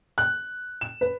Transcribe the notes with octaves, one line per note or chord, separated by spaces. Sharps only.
F#6
E7
B4